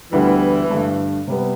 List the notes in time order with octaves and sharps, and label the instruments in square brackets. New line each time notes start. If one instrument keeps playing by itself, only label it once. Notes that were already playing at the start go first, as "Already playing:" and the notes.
[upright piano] D2 D3 G3 B3 E4 [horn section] E3
[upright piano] G2 D3 A3
C3 G3 B3